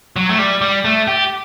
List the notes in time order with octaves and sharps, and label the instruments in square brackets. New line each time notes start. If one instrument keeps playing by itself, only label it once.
[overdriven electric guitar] F#3
A3
G3
G3
A3
G4